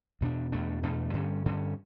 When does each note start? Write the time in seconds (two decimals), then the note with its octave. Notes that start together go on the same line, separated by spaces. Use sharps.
0.21 E2 B2 A3 D4
0.52 E2 B2 A3 D4
0.83 E2 B2 A3 D4
1.14 G2 D3 G3 C#4
1.45 G2 D3 G3 C#4